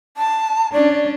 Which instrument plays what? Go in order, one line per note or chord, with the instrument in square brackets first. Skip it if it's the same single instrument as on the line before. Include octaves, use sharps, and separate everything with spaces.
[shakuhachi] A5
[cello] C#4 D4 [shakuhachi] D5